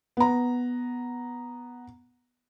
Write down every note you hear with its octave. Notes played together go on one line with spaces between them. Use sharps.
B3 A#5